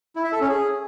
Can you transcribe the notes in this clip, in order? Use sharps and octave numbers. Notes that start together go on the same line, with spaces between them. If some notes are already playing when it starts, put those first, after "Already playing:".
E4
E5
A4
C#4
G#4